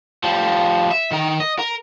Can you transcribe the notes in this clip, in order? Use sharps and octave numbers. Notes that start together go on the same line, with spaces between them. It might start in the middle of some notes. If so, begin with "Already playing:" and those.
F3 G3
E5
D#3 A#4
D#5
A#4